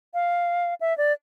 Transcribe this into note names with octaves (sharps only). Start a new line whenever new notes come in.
F5
E5
D5